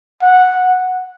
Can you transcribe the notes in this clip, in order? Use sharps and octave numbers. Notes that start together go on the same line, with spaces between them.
F#5